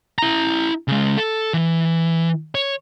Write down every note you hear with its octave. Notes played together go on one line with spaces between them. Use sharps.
E4 A#5
C#3 G#3
A4
E3
C#5